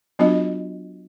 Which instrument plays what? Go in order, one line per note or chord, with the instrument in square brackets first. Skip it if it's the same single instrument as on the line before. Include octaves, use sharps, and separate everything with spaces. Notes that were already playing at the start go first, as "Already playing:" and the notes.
[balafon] F#3 B3 D4 F4 F#4 D#5